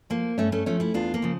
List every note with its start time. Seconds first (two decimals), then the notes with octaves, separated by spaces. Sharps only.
0.10 F3 A#3
0.38 G2 A3 C#4
0.52 A3 C#4
0.66 F3 A3 C#4
0.80 C#4 E4
0.94 E2 D4 F4
1.14 A#3
1.22 C#3 F3